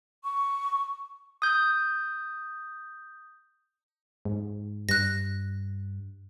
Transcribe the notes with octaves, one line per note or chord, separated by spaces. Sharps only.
C#6
D#6 G6
G#2
G2 F#6 A#6